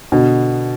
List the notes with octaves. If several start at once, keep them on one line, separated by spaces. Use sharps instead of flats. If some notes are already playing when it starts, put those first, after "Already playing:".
B2 D3